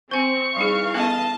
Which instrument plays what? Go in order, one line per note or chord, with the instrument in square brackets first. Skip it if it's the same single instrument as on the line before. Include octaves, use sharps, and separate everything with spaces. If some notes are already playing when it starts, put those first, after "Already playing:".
[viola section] C4 [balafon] C5 G#5 [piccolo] C#6
[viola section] E3 F5 [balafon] G3 D#4 G#4
[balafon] B3 C#4 A4 [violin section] D#5 A5